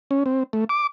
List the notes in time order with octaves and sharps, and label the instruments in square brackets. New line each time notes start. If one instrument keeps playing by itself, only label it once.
[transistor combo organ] C#4
C4
A3
D6